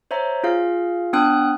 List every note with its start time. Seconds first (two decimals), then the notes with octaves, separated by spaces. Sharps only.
0.11 C5 C#5 E5 A#5
0.43 F4 G#4 F5
1.13 B3 D4 G5 D#6 F#6